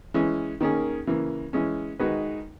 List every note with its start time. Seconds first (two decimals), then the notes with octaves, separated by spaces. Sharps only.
0.14 E3 G#3 C#4
0.61 D#3 A#3 C#4 G#4
1.07 C#3 E3 A#3
1.53 E3 G#3 C#4
1.99 D#3 G#3 D#4 F#4 B4